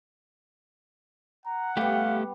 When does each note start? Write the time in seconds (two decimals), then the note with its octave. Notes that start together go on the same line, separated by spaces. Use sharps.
1.46 F#5 A#5
1.77 G3 A3 B3 G4 F5